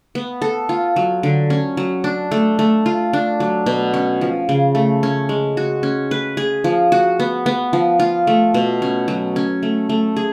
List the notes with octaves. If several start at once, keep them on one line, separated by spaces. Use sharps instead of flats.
B3
A4
F4
F#3
D3
C#4
F#3
D4
A3
A3
F4
D4
F#3
B2
C#4
F3
C#3
A3
C#4
G#3
F#4
C#4
B4
G#4
F3
F#4
B3
B3
F3
F4
A3
B2
C#4
F#3
C#4
A3
A3
G#4